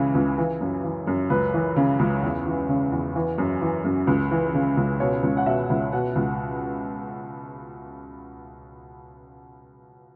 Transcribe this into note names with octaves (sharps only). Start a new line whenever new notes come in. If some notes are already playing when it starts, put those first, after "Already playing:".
Already playing: C#2 C#3 E3
C#2
E3
F#2
E3
F#2
C#2 B4
E3
C#3
C#2
E2
E3
C#3
E2
E3
F#2
E3
F#2
C#2
E3
C#3
C#2
B2 C#5
C#2
F#5
B2 E5
C#2
B2 F#5
C#2